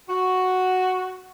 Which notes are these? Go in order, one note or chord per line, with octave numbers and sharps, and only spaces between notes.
F#4